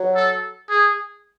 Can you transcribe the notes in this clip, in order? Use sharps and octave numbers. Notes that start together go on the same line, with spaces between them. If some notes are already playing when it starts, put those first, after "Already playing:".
Already playing: F#3
A4
G#4